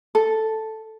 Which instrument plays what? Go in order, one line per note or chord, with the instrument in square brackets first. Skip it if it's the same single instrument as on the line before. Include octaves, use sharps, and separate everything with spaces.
[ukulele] A4